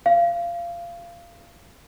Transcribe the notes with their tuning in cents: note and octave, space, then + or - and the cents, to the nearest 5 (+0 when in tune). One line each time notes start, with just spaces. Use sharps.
F5 -20